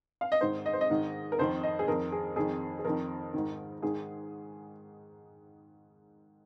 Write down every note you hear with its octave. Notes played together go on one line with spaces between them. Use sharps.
F5
D#5
G#2 D#3 C5
D#5
C5
D#5
G#2 D#3
A#4
F2 D#3 C5
D#5
G#4
F2 D#3 A#4
G#4
F2 D#3 G#4
G#4
F2 D#3 A#4
G#2 D#3
G#2 D#3 G#4